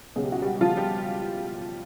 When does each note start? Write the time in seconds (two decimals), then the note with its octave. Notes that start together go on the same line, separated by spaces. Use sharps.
0.16 C#2 B2 F#3 G#4
0.23 G4
0.32 F#4
0.42 G3 G4
0.61 F3 F4
0.77 G3 G4